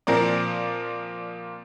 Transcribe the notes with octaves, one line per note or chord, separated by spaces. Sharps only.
A#2 F3 C4 A#4 D5